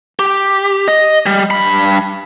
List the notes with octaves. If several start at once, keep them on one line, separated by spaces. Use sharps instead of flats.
G4
D#5
G3
G2 B5